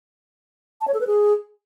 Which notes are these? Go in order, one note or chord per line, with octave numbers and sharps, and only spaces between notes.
A5
C#5
A4
B4
G#4